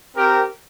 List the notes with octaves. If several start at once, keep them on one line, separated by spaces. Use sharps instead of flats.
C4 G4 A#4